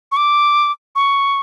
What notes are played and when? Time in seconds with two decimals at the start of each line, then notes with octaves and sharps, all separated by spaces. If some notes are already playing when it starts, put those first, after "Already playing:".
0.12 C#6
0.17 D6
0.95 C#6